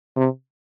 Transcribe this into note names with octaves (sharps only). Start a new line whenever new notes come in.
C3